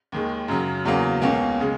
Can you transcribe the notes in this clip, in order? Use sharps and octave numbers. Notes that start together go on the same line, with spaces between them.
D#2 D#3 G#3
F#2 C#3 F#3
E2 C#3 F#3 A#3
C#2 B2 A#3 C#4
C#3 G#3